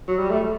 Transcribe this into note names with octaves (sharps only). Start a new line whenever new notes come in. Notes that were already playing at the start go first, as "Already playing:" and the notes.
F#3
G3
A3